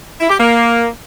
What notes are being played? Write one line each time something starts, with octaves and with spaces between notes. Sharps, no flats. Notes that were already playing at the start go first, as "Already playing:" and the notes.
E4
G4
A#3